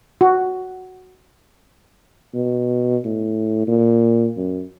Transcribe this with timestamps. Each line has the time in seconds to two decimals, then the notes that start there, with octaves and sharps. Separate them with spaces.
0.21 F#4
2.34 B2
3.05 A2
3.67 A#2
4.37 F#2